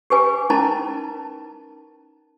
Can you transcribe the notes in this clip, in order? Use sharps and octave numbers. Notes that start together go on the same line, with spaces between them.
G4 G#4 B4 G#5
C#4 D#4 E4 A#4 A5 A#5